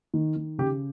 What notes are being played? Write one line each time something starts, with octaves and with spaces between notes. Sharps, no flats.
D#3
D#3
C#3 G4